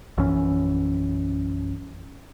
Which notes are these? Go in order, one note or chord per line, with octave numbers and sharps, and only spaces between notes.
A#1 F#2 E3 C#4